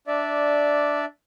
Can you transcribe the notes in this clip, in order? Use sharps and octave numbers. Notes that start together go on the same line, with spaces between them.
D4 D5 E5